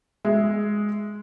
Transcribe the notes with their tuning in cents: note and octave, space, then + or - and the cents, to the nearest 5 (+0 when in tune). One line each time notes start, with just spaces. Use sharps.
G#3 +0 E5 +0